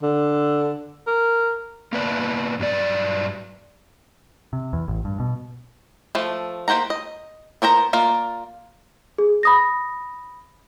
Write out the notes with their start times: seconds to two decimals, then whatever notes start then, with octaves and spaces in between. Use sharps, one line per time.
0.03 D3
1.07 A#4
1.93 A#3 B3 B4 D5 A5
2.59 G2 F#3 D5
4.53 C3
4.73 E2
4.88 A1
5.05 G2
5.20 B2
6.15 F3 A3
6.68 A#3 G4 C5 F#5 A#5
6.90 D#5
7.62 B3 A#4 C5 A#5
7.93 A#3 F4 A#4 D5
9.18 G#4
9.43 B5 D#6 A#6